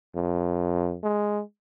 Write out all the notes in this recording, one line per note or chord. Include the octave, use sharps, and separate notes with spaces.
F2
G#3